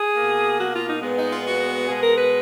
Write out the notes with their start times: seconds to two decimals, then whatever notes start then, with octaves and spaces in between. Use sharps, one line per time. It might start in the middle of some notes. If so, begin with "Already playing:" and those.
Already playing: G#4
0.16 B2 A#3
0.59 F#4
0.74 F4
0.88 D#4
1.02 A#2 G#3 B3
1.17 D#4
1.31 F4
1.45 F#4
1.88 B2 G#3 B3 G#4
2.02 A#4
2.17 B4